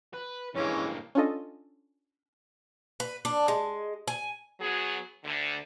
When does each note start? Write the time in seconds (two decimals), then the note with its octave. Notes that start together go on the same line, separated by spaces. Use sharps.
0.14 B4
0.55 G2 E3 G#3 A#3 C#4
1.15 C#4 D4 F4 A4 D#5
3.00 B4
3.25 D4
3.48 G#3
4.08 G#5
4.61 F#3 B3 F#4 G#4
5.25 D2 D3